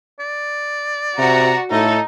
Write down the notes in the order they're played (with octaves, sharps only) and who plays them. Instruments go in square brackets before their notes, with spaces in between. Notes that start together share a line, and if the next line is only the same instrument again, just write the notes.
[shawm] D5
[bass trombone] C3 [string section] F#4 [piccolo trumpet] A#5
[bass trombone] A2 [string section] D#4 [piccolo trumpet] A4